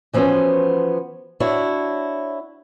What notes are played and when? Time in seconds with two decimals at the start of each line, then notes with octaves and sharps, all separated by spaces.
0.13 E3 F3 B3 C#4 F#4 C5
1.40 D4 E4 F#4 C#5